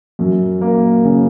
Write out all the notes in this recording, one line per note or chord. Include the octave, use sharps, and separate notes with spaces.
F#2
A#3
C#3